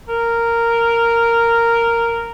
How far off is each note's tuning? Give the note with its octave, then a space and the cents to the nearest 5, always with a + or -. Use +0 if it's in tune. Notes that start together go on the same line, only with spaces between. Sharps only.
A#4 -10